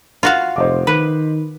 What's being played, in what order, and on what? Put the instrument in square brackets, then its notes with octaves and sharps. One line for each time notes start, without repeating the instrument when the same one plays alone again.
[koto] F4 F#4 F5
[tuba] F1 [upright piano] C5 D#5 D6
[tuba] D#3 [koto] B4